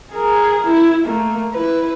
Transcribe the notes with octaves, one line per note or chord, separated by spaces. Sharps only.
G#4 A#4
E4
A3 A#3
E4 B4